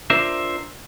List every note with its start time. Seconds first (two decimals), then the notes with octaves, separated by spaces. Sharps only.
0.10 D4 F4 A#4 C5 E5